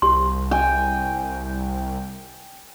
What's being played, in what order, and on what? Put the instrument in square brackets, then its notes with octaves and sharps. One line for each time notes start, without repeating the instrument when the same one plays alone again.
[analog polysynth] C2 [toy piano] G4 C6
[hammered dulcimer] G5 G#5